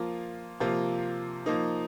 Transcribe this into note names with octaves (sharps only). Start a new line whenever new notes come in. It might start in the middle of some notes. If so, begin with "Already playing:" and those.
Already playing: F3 A#3 F4
C3 F3 A#3 F4
F3 A#3 D#4